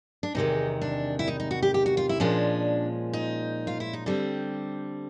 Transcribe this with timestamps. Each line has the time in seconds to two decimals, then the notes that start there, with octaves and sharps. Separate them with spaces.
0.23 D4
0.35 E2 C3 D#3 G#3 D#4
0.81 D4
1.19 E4
1.28 D#4
1.40 D#4
1.51 F#4
1.63 G4
1.74 G4
1.86 F#4
1.97 F4
2.09 E4
2.20 A#2 F3 G#3 C#4 D4
3.13 D#4
3.67 F4
3.80 E4
3.93 D#4
4.06 D3 G3 C4 D4